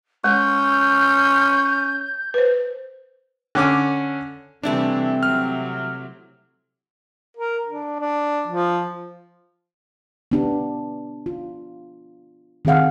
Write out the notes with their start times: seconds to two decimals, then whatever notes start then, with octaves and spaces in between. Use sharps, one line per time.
0.24 G#3 C#4 G6
2.34 B4 C5
3.55 D3 C#4 D6
4.63 C3 E3 G3 A3 C4 D4 E4 D5
5.23 C3 F#3 F6
7.37 A#4
7.68 D4
8.00 D4
8.48 F3
10.32 B3 D4 G4
11.26 F4
12.65 D#3 C4 G#4 F5 F#5